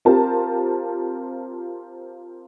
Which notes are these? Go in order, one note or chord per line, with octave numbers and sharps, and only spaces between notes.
C4 F4 G4 A#4 A5